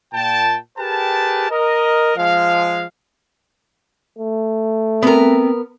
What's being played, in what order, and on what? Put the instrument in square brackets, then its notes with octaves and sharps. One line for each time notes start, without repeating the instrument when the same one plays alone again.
[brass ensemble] A#2 G5 A5
G4 G#4 A#4 B4 G5 A5
A#4 D#5
F3 G#3 F5
[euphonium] A3
[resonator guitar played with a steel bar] B3 A#4 [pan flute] C4